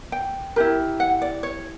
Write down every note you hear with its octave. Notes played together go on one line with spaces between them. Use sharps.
G5
E4 G4 A#4
F#5
D5
C#5